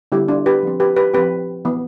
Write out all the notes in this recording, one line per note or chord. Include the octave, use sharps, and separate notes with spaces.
D3 G3 B3 E4 G4
D4 F4
G4 B4
F3 C4
G4 B4
G4 B4
F3 C4 G4 B4
E3 B3